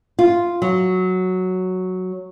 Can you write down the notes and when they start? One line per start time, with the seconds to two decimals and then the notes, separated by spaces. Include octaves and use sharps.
0.19 F4
0.62 F#3